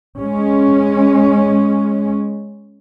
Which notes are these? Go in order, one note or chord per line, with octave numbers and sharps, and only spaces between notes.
G#3 C#4